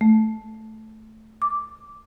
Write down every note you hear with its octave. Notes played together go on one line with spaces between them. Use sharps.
A3
D6